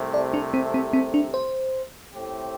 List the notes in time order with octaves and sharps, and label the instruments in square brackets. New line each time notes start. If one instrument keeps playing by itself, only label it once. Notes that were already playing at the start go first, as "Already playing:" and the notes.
Already playing: [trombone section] C2 C3 A3
[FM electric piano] D5
D4
C4
C4
C4
D4
C5
[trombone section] A2 A3 C4 G4